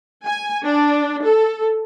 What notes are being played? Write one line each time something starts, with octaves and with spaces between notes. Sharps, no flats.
G#5
D4
A4